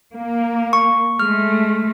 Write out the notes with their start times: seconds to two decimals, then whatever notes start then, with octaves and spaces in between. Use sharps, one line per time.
0.15 A#3
0.73 C#6
1.19 G#3 A3 F6